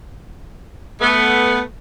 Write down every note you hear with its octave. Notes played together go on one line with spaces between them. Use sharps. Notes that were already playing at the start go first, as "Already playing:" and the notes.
A3 B3